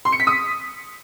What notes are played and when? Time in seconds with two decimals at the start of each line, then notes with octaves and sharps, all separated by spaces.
0.05 C6
0.12 C#7
0.20 B6
0.27 D#6